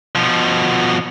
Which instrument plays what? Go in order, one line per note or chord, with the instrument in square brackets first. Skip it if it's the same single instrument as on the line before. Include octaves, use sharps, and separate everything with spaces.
[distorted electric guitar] B2 F3